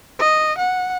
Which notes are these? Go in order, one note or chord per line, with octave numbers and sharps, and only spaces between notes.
D#5
F#5